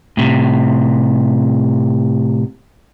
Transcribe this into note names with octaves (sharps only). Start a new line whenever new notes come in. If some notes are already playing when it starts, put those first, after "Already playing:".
A2 C3